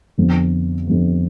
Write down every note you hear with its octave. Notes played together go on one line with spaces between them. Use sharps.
F2 D3 F3 B3
F2 D3 F3 B3